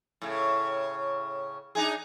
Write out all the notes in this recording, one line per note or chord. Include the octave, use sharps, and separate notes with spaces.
A2 C#3
D4 D#4 G#4